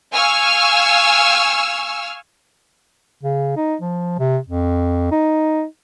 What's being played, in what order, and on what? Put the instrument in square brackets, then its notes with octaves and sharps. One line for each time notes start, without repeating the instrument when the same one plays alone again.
[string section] F5 G#5 C#6 E6 F6
[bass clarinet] C#3
D#4
F3
C3
F2
D#4